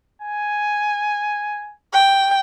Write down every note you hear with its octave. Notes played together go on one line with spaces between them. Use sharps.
G#5
G5